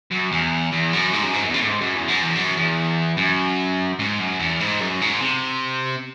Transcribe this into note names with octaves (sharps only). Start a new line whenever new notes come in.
F#2
E2
E2
F#2
G#2
F#2
G#2
F#2
E2
F#2
A2
G#2
F#2
E2
F#2
E2
F#2
E2
F#2
G#2
F#2
E2
G#2
F#2
G#2
C3